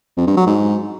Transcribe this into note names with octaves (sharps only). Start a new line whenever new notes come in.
F2
G2
F#3
G#2